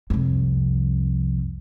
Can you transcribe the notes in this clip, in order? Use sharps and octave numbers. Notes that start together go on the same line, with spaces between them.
C2 F2